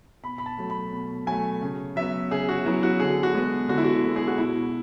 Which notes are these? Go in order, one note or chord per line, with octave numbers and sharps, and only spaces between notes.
B2 B5
B5
A5
F#3 A3
B5
B2
F#3 A3 G#5
C#3
F#3 B3 E5
C#3 G#4
F#4
F#3 B3 E4
F#4
D3 G#4
F#4
G#3 B3
D3 F#4
E4
F#4
G#3 B3
G#4
F#4
B2 E4